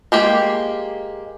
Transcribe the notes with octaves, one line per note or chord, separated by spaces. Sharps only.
G#3 A#3 G4